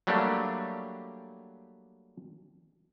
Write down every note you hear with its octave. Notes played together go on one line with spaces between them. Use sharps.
F#3 G3 A3 A#3 D4 G4